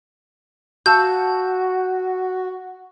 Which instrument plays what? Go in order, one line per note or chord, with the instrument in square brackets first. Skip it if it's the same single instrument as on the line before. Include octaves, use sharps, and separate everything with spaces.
[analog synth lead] F#4 [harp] F5 A5 E6 [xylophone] G6